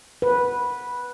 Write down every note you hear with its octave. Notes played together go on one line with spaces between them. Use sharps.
B4